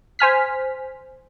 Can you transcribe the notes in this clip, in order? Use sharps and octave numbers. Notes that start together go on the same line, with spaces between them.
C5 G#5 F6 B6